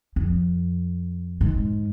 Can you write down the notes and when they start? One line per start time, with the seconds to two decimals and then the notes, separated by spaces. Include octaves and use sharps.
0.16 F2
1.41 G#2